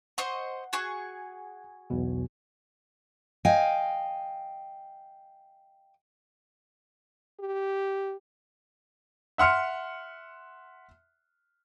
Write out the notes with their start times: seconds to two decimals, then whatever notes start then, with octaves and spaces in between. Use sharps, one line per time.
0.18 C5 D#5 F#5 C#6
0.73 F#4 G#4 C#6
1.90 B1 E2 B2
3.45 D#5 F5 G5 G#5
7.40 G4
9.38 E5 F#5 C6 F6 C#7